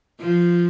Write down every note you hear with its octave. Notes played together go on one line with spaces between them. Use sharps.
F3